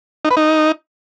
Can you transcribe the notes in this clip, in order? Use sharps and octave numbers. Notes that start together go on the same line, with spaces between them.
D#4
B4
D#4